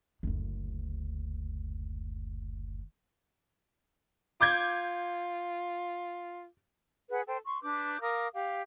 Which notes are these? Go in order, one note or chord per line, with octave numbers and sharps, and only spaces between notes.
F#1 D2
F4 D6 G6 G#6
G#4 B4 F#5
A4 C5 G5
C6 C#6
D4 B4 D6 G6
A#4 F5 D6 D#6
G4 F5